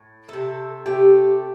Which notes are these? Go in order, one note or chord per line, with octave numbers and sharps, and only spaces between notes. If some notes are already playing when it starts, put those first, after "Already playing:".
Already playing: A2
C3 A3 A4
C3 A3 G4